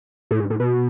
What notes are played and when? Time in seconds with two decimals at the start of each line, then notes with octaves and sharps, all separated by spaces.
0.31 A2
0.40 G#2
0.50 A2
0.60 B2